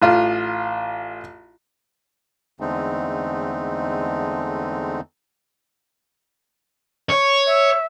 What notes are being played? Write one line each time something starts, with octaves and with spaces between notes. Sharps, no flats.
A1 F4
E2 D3 G#3 A3 C4 D#4
C#5
E5